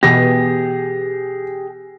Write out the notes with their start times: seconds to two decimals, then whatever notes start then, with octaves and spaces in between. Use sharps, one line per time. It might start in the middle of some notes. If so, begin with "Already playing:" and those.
0.03 B2 E3 B3 G4 G#4 A#6